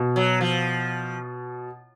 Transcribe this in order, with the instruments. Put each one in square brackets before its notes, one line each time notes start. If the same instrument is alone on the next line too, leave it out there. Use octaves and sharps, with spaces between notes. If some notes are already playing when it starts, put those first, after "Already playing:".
Already playing: [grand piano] B2
[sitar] F#3
F3